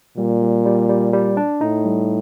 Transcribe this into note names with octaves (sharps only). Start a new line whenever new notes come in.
A#2 G3
G3
G3
G3
G3
D4
A2 D#4
G3